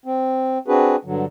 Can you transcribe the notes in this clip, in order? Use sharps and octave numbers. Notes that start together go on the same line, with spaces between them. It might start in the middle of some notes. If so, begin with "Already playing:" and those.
C4
C4 D4 F#4 G#4 B4
G2 D3 F#3